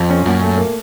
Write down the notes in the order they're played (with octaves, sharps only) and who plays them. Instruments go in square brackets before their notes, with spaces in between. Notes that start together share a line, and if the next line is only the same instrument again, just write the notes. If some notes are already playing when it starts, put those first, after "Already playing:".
Already playing: [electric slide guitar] F2 [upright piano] F3
[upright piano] C#4
[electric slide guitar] F#2 [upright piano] A#2
[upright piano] A3
A#3